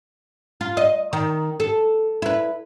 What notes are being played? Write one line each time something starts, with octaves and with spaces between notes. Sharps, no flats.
F4
D#5
D#3
A4
E4 B4